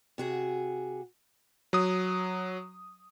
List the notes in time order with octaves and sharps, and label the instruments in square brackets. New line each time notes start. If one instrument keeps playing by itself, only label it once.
[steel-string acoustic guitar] C3 F#4 G#4
[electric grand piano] F#3 D#6